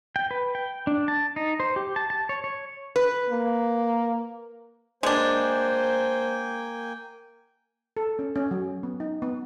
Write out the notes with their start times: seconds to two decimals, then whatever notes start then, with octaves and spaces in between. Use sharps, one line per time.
0.16 G5
0.31 B4
0.55 G5
0.87 D4
1.08 A5
1.36 D#4
1.60 C5
1.76 G4
1.96 A5
2.10 A5
2.29 C#5
2.44 C#5
2.96 B4
3.29 A#3
5.03 G#3 A#3 D4 C5 G5 G#5
7.97 A4
8.19 C#4
8.36 C#4
8.51 F#3
8.83 B3
9.00 D#4
9.22 B3